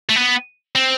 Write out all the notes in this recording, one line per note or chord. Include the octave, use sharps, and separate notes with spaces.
A3
B3
C4